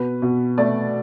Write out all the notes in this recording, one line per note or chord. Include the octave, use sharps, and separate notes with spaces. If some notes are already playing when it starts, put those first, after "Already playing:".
Already playing: B2 B4
B2
A3 D5